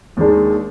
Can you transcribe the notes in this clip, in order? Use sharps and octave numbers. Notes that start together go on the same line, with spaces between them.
D#2 D#3 G#3 D4